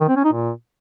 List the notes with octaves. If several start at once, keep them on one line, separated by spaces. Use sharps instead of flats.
D#3
C4
C#4
D#4
A#2